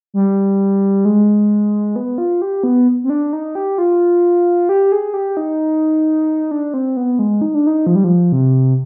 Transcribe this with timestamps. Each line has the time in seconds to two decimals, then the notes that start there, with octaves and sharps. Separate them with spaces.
0.14 G3
1.05 G#3
1.96 B3
2.18 F4
2.42 G4
2.64 B3
3.04 C4
3.10 D4
3.33 D#4
3.55 G4
3.78 F4
4.69 G4
4.92 G#4
5.14 G4
5.37 D#4
6.51 D4
6.74 C4
6.97 B3
7.19 G#3
7.41 D#4
7.54 D4
7.67 D#4
7.87 F3
7.95 G3
8.04 F3
8.32 C3